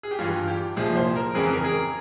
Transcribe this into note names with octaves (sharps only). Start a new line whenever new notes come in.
G#4
G4
G2 E3 F4
G4
C2 A#2 F3 G#4
C5
A#4
F2 C#3 E3 G#4
A#4
G#4